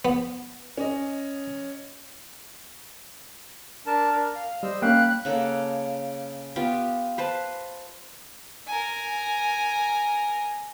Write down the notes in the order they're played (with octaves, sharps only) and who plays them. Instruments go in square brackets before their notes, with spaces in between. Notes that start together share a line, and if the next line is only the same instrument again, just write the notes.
[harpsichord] B3
[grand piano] C#4 D#5
[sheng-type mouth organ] D4 A#4 A5
D4 A#4
F5
[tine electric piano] G3 [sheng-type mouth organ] C5 D#5 E6
[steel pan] A#3 C#4 [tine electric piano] F5 G5 [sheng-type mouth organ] B5 [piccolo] F#6
[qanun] C#3 A#3 A4 F#5
B3 F4 G4
B4 C5 A5
[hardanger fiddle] A#4 G#5